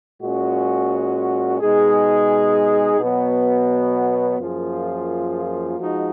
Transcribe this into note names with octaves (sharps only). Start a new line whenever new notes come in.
A#2 G#3 C#4 F#4
B2 G#3 D#4 G#4
B2 F#3 B3
F#2 F3 A#3 F4 G#4
F3 G#3 D#4 F#4